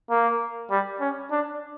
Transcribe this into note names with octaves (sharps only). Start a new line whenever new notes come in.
A#3
G3
C#4
D4